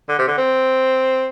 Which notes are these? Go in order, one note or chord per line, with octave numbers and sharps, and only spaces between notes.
D3
C3
D3
C4